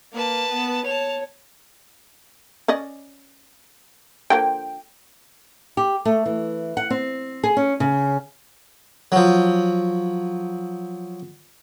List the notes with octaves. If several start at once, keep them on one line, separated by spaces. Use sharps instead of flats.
A#3 B4 A5
B3
C#5 A5 F7
C#4 D5 D#5
D3 F3 A#3 G5
G4
A3
E3
F#5
C4
G#4
C#4
C#3
F3 F#3